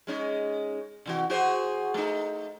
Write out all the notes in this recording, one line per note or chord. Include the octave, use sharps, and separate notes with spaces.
G#3 C#4 D#4
C3 E3 F#4
F#4 G#4 C5
A3 D#4